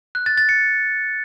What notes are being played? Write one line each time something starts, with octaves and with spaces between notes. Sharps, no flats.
F#6
A6
A6
C#7